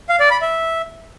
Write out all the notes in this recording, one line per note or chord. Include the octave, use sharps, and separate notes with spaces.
F5
D5
B5
E5